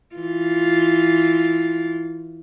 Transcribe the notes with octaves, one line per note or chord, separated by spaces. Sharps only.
E3 F4